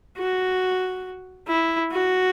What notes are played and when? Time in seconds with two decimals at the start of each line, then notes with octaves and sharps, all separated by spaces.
0.18 F#4
1.48 E4
1.92 F#4